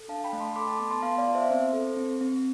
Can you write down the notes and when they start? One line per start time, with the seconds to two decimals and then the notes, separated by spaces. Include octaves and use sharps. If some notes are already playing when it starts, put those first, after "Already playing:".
Already playing: A4
0.08 D4 F5 A5
0.24 G5 B5
0.33 A3
0.40 A5 C6
0.56 A4 B5 D6
0.68 A5 C6
0.80 B3 A5 C6
0.91 A5 C6
1.02 B3 F5 A5
1.18 D5 F5
1.27 F4
1.35 C5 E5
1.50 C4 C5
1.73 A4
1.97 C4
2.21 C4